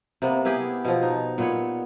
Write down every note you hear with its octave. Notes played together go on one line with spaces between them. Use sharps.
C3 A#3 B3
B3 E4 G4 G#4
B2 F3
D#4
A#2 B3 C#5